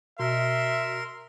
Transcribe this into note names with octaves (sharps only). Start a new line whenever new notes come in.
B2 A#4 E5 C6